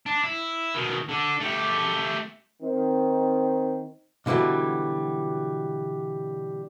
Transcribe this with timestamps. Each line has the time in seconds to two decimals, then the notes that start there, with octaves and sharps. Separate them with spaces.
0.06 D4
0.23 E4
0.75 B2 D#3
1.09 D3 D4
1.40 A3 G4
2.61 D#3 C4
4.26 B2 D3 E3 F#3 G3